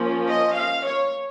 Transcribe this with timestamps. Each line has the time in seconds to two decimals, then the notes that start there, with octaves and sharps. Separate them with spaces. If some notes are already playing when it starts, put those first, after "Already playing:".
Already playing: F3 A#3 C#4
0.29 D#5
0.57 F5
0.86 C#5